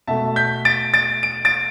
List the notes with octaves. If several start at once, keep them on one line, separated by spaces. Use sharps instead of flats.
B2 A3 E5 A5
G6 B6
A6 D7
A6 D7
D7
A6 D7